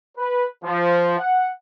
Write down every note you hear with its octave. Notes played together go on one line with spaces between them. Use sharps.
B4
F3
F#5